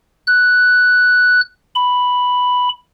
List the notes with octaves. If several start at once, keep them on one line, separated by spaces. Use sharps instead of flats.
F#6
B5